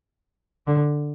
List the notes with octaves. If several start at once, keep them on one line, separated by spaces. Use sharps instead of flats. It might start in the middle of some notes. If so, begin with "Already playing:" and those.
D3